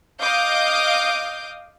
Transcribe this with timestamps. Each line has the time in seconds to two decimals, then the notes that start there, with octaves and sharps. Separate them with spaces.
0.20 D#5 F5 D6 D#6 G6